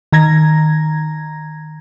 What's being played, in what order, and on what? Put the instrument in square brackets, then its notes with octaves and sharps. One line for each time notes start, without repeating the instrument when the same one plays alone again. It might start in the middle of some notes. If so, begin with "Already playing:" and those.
[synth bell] D#3 A#5 G#6 A#6